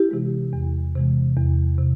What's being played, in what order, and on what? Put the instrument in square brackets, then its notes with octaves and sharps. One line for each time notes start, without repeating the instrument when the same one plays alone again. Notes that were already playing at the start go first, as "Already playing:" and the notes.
Already playing: [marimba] E4 G4
C3 E3 G#3
E2
C3 E3 G#3
E2
C3